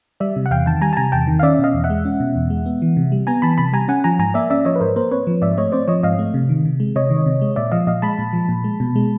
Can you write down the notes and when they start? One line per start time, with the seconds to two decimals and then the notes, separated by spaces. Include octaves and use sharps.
0.20 G3 D5 E5
0.36 C3
0.46 F#5
0.51 E2 F5 G5
0.66 D#3 G5 A5
0.82 G3 G#5 A#5
0.93 A5
0.97 C3 G#5 A#5
1.12 E2 G5 A5
1.27 D#3
1.39 F5
1.43 C#4 D5 E5
1.59 B2 D#5 F5
1.74 E2
1.84 E5 F#5
1.90 G#3
2.05 C#4
2.20 B2
2.36 E2
2.50 G#3
2.66 B3
2.82 E3
2.97 C3
3.12 G3
3.27 B3 G#5 A#5
3.42 E3 A5 B5
3.58 C3 A5 B5
3.73 G3 G#5 A#5
3.88 C#4 F#5 G#5
4.04 F3 G#5 A#5
4.19 G#2 G#5 A#5
4.34 A#3 D5 E5
4.50 C#4 D5 E5
4.65 F3 C#5 D#5
4.75 B4
4.80 G#2 A#4 C5
4.96 A#3 A#4 C5
5.11 C4 B4 C#5
5.27 F3
5.42 G#2 D5 E5
5.58 A3 C#5 D#5
5.72 C4 C5 D5
5.88 F3 C#5 D#5
6.03 G#2 D#5 F5
6.19 A3
6.34 C3
6.49 D#3
6.65 C3
6.80 G#3
6.95 C3 C#5 D#5
7.10 D#3
7.26 C3
7.41 G#3
7.56 A#2 D5 E5
7.72 F3 D#5 F5
7.87 A#2 D#5 F5
8.02 G#3 A5 B5
8.19 A#2
8.33 F3
8.49 A#2
8.64 G#3
8.80 B2
8.96 G#3